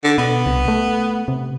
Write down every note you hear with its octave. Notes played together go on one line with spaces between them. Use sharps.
D3
B2 B3
C2
A3
C3